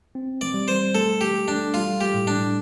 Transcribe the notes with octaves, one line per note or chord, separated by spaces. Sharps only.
C4
D5
G3
C5
A3 A4
G4
A4
D4
G3 F4
G4
A2
D4